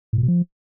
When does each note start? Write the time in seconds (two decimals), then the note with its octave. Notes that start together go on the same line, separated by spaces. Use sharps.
0.13 A2
0.18 A#2
0.23 B2
0.28 F3